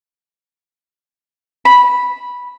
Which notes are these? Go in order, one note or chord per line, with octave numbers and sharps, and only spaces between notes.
B5